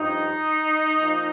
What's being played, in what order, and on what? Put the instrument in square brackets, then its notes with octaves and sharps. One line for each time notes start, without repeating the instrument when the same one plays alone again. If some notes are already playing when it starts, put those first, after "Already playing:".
Already playing: [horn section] G2 F3 D#4
A#2 F3